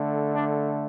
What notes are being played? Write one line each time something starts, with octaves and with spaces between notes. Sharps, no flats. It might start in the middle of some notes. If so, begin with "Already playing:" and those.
Already playing: D3 A3
D4